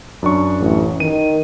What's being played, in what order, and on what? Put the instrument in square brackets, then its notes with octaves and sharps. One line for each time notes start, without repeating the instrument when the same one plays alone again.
[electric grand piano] F#2 D4 C#6
[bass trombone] A1
[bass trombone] D#3 [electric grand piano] D#7